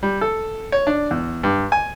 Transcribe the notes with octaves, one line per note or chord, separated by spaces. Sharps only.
G3
A4
C#5
D4
E2
G2
G#5